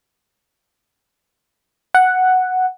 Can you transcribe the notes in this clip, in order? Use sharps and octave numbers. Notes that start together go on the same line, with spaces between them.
F#5